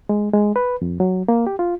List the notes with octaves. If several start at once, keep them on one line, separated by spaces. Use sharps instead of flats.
G#3
G#3
B4
F2
F#3
A#3
G4
F4